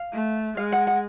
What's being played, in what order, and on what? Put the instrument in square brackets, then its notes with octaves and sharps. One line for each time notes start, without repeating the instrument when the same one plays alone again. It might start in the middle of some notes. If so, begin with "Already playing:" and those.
Already playing: [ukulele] F5
[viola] A3
[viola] G#3 [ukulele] F5
[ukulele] F#5
F#5